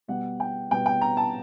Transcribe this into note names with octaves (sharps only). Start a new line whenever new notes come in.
B2 G3 B3 F#5
G5
B2 G3 B3 G5
G5
A#5
A5